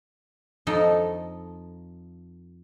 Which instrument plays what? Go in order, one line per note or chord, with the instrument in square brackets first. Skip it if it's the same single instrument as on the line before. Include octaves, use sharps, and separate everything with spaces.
[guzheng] F2 F3 D#4 A4